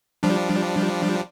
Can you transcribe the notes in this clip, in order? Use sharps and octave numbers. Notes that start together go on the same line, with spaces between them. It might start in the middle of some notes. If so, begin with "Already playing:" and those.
F3 G3 D4